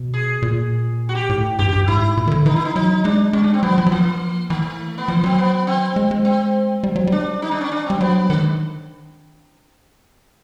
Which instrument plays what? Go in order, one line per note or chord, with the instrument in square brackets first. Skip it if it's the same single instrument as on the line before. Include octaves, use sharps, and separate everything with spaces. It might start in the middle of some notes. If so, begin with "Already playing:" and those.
Already playing: [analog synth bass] B2
[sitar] G#4
[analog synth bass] A#2
[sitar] F#4
G4
[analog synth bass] A2
[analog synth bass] G2 [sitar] G4
[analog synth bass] G2 [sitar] G4
[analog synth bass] G#2 [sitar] E4
[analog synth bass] A#2
D#3
D3
[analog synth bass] E3 [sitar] D#4
[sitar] E4
D#4
[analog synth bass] F#3 [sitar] D#4
[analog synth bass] G#3 [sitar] D4
[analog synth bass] G#3 [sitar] C#4
[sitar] D4
C4
[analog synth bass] F#3 [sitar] B3
[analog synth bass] F3
F#3
[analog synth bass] F3 [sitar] A#3
[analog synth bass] E3 [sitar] A3
[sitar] B3
[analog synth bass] F3 [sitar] A#3
[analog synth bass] F#3 [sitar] C4
[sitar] B3
C4
[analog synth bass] G#3
G#3
[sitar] C4
[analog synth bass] G3
F#3
[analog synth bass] G3 [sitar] D4
[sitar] D#4
D4
C#4
D4
[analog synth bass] G3 [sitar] C4
[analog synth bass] F#3 [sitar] B3
[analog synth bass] D#3 [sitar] G#3